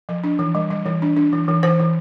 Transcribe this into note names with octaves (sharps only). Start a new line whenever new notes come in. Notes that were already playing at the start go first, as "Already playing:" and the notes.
F3
D4
E3
G3
G3
E3
D4
D4
E3
E3
E3 C5
E3